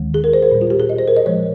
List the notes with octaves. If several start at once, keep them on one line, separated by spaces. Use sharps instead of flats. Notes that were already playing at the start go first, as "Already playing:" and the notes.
Already playing: D#2 D#3 G#3
G#4
A#4
C5
A#4
A#2 G3
F4
G4
G#4
D#5
C5
A#4
D#5
A#2 F3 G#3 C#5